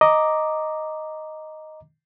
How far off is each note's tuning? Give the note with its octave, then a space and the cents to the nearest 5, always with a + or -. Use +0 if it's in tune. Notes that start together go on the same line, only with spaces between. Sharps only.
D#5 +0 A#5 +0 D6 +0